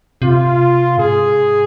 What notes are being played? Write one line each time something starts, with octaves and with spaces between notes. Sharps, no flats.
C3 F4
G#2 G#4